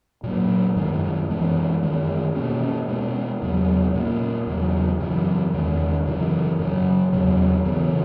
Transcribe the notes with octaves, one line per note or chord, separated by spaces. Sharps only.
A#2 F#3 A#3
F#2 D#3 G#3
F#2 E3 G#3 B3
F#2 D#3 G#3
B2 A#3 C#4
B2 G#3 B3
E2 C#3 F#3 B3
A#2 A#3 C#4
E2 C#3 F#3
F#2 C#3 E3
E2 D#3 G#3
F#2 C#3 E3
F#2 C#3 F#3
E2 C#3 F#3
C#3 E3 B3